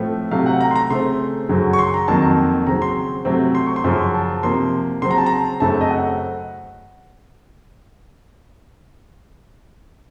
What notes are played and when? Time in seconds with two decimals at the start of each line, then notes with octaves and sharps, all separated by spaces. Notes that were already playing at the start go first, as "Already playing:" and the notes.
Already playing: A2 F3 A3 C4
0.31 C3 F#3 A3 F5
0.46 F#5
0.61 A#5
0.71 C6
0.76 A#5
0.90 C#3 A3 C4 C6
1.49 F#2 C#3 F#3
1.73 C#6
1.79 C6
1.94 A#5
2.08 F2 D#3 F#3 A#3 A5
2.67 C#3 F#3 C4 A#5
2.82 C6
3.25 C3 F#3 A3 C4
3.55 C6
3.66 C#6
3.76 C6
3.84 F#2 C#3 F3
4.14 A5
4.43 C3 F3 A#3 C6
5.02 C#3 F#3 C4 C6
5.11 A#5
5.18 A5
5.26 A#5
5.60 F#2 C#3 A3 C4 A5
5.81 D#5
5.91 F#5